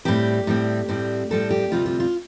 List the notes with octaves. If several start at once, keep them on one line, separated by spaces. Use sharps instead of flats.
A2 G3 C4 G4
A2 G3 C4
A2 G3 C4
A2 G3 C4 A4
G4
D2 C3 G3 C4 F4
F4
F4